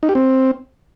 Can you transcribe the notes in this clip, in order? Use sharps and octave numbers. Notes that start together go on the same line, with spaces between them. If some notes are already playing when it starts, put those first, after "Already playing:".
D#4
G4
C4